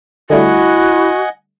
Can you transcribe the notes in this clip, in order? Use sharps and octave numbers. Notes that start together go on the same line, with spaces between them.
D3 G3 A3 E4 F#4 D#5 F#5 G#5